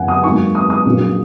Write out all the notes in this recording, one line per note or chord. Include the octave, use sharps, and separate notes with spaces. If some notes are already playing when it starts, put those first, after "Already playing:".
Already playing: G#1 F#2 C#3 F#5 G#5
D#6
G#2 F#3 A#3 D#4 C#6
D#6
D#6
A#1 A#2 F#3 C#4